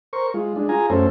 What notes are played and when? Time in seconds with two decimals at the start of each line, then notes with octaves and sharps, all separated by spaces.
0.13 A#4 C5 C#6
0.34 G#3 F4
0.56 G#3 D4
0.69 F4 G#4 G#5 A#5
0.90 F#2 A3 C#4 A4 C5